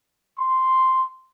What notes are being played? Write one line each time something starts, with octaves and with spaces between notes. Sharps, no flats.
C6